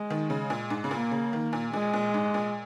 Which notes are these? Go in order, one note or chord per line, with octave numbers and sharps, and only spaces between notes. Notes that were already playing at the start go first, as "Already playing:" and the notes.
Already playing: G#3
D#3
C#3
A#2
G#2
C#3
A#2 A#3
C#3
D#3
A#2
A#2 G#3
A#2
G#2
A#2